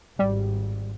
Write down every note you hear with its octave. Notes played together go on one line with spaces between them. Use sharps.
G#1 G3